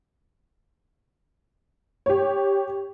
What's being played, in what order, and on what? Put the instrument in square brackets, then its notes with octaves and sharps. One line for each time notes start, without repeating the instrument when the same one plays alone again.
[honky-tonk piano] G4 C#5